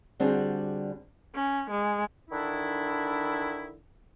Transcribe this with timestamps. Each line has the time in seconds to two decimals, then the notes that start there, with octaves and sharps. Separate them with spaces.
0.20 D3 G3 C4 D4 F#4 G#4
1.35 C#4
1.71 G#3
2.29 D3 D#3 D4 E4